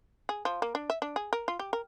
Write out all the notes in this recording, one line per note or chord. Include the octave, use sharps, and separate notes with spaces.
G#4
F3
A#3
D4
E5
D4
G#4
A#4
F4
G4
A#4